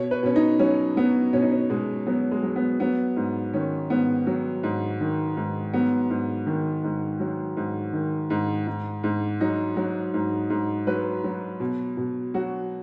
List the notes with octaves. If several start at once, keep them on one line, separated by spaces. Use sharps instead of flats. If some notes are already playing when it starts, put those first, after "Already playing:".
Already playing: B2 C#5
B4
B2 C#4
D#4
F#3 C#4
F#3 B3
B2 C#4
D#4
C#4
B2 G#3
F#3 B3
G#3
F#3
B3
F#3 B3
G#2
D#3 C#4
G#2 B3
F#3
G#2
D#3
G#2
F#3 B3
G#2
D#3
G#2
F#3
G#2
D#3
G#2
G#2
G#2
F#3 D#4
F#3
G#2
G#2
F#3 B4
F#3
B2
B2
F#3 F#4